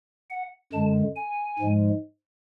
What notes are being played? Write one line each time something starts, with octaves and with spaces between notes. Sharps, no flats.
F#5
F#2 D3 G#3 A5
G#5
G#2 F3 G#3